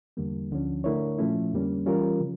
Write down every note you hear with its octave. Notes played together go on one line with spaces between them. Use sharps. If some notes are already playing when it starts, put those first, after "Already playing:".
E2 D3 G3 A#3
D2 D3 F3 C#4
D3 A3 E4 A#4 C#5
A#2 F3 A3 C#4 E4
F2 D3 G3 A#3 C#4
E3 G3 C#4 F4 A#4
C#3 F3